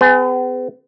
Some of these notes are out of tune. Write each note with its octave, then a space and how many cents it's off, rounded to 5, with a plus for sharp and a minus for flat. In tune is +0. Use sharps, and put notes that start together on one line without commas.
B3 +45 G#4 +0